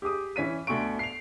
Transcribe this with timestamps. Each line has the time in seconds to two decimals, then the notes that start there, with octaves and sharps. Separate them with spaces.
0.02 G4 G#4 D6 D#6
0.36 E3 C#4 B6 D#7
0.67 D2 B2 C#6 D7
0.99 C7 F7